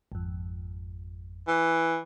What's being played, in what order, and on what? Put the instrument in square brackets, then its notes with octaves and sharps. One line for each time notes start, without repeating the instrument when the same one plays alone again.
[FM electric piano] G#1 F2
[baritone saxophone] E3